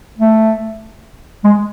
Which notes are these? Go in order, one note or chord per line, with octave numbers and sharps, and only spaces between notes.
A3
G#3